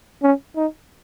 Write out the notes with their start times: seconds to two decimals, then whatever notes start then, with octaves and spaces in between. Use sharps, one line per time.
0.23 C#4
0.56 D#4